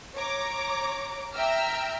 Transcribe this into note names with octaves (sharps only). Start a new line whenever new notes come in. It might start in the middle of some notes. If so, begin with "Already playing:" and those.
C#5 A#5 D6
E5 G5 A#5 E6 F6